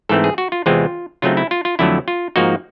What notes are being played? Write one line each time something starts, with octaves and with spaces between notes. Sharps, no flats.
G#2 E3 A3 C4 A4
G#4
F#4
F4
E2 C3 E3 G#3 C4 F4
C#3 F#3 A3 C4 D#4 F4
E4
F4
F4
F2 D3 F#3 A3 E4
F4
G#2 F3 A#3 D#4 F#4